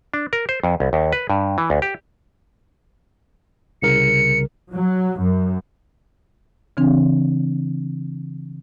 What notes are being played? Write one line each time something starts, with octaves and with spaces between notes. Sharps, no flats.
D4
A#4
C5
F2
C2
D#2
B4
G2
E3
D2
G4
C2 C#3 A#4 C#7
F#3
F#2
C#3 E3 C4 D4